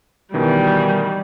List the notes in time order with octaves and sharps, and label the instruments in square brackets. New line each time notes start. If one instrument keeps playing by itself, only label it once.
[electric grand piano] B2 D#3 E3 [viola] G3